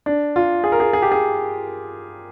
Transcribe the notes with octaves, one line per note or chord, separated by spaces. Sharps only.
D4
F4
G#4
A#4
G#4
G#4
G4
G#4